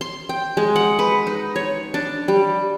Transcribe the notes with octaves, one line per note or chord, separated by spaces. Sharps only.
C6
G5
G#3
F#5
B4
D#4
C#5
D4
G3